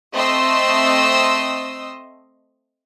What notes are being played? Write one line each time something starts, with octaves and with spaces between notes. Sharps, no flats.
A3 C4 D#5 C6 D#6 E6